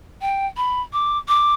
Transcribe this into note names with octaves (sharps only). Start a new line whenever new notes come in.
G5
B5
D6
D6